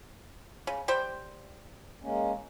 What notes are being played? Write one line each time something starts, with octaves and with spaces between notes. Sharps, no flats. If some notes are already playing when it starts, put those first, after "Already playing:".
C#3
G3 C5 G5
G#3 A#3 C#4